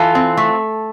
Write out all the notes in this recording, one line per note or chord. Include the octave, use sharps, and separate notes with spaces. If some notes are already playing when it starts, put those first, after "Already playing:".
Already playing: E3 F4 A4
C4
A3